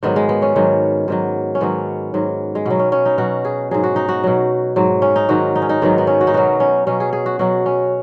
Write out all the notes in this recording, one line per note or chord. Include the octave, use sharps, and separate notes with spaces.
G#2 D#3 F#3 B3
G#3
B3
C#4
G#2 D#3 F#3
G#2 D#3 F#3
C#4
G#2 D#3 F#3 B3
G#2 F#3
G#3
B2 F#3 B3
C#4
C#4
D#4
B2 F#3 F#4
G#4
G#2 F#3 G#4
F#4
D#4
F#4
B2 F#3
G#2 F#3
C#4
D#4
G#2 D#3 F#3 F#4
D#4
C#4
D#4
G#2 D#3 F#3 B3
B3
C#4
F#4
D#4
B2 F#3 F#4
C#4
B2 F#3 C#4
G#4
G#4
F#4
B2 F#3 F#4
C#4